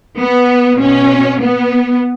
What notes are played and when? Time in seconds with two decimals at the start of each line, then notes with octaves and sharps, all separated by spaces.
0.17 B3
0.79 B2 C#4
1.40 B3